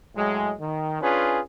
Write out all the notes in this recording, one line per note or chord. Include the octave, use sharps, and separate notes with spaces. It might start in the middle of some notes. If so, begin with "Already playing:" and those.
A2 F#3 G#3
D#3
C#4 D4 F4 G#4 B4